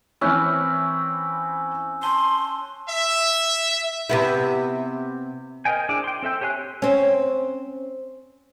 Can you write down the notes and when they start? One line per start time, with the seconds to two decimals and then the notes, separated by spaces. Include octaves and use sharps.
0.21 E3 C4 C#4 E4 E6 F#6 G6
2.03 A5 C6 G7
2.89 E5
4.09 C3 B3 E4
5.65 A#4 C5 D#5 G5 G#5
5.89 D4 E4 G#4 G#5 D6
6.04 G5 C6
6.23 C4 A4 E5 G5
6.41 G4 C#5 G#5 C6 F#6
6.82 C4 C#4